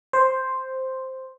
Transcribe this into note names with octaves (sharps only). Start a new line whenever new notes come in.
C5